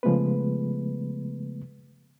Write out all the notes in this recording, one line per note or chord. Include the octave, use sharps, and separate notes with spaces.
C#3 F3 G#3 A3 B3 B4